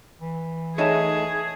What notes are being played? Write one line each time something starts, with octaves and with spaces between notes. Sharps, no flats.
E3
A3 D#4 G#4 C#5 D#5 E5 A5